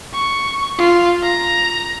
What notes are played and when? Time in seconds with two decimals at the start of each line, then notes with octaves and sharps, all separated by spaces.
0.14 C#6
0.79 F4
1.23 A#5